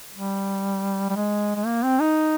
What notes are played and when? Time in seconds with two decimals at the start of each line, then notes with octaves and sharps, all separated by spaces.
0.15 G3
1.10 G3
1.16 G#3
1.55 G#3
1.66 A#3
1.83 C4
2.00 D#4